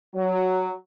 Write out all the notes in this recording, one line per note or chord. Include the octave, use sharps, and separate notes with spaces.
F#3